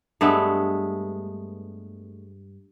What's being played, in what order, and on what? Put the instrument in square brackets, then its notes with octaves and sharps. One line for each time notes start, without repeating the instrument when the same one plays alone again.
[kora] G2 G#3 A3 B3